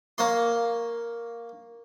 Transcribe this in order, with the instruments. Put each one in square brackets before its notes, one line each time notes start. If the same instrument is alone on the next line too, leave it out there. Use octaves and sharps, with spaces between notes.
[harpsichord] A#3 C#5 C6